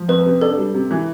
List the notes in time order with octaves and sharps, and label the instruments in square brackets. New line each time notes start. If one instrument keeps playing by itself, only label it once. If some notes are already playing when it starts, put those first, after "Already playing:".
Already playing: [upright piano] F3
[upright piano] F2 [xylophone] B4
[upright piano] C3
[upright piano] D4 [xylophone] A4
[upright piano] G3
C3
E3